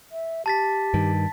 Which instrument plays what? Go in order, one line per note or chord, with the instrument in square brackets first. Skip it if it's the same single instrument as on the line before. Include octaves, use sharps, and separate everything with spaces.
[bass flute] E5
[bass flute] G4 [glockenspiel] A5 A6 B6
[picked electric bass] G2 D#3